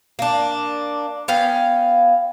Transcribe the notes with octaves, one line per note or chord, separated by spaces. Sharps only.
A#3 D4
B3 C#4 F5 G5